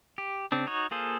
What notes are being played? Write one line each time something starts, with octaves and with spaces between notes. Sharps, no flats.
G4
C#3 C4 D4
D#4 F#4 C#5
A#3 F4 G#4 A4 C5